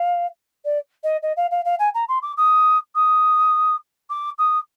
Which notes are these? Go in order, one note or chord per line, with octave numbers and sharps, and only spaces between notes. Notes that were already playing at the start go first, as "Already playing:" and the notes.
Already playing: F5
D5
D#5
D#5
F5
F5
F5
G#5
A#5
C6
D6
D#6
D#6
D6
D#6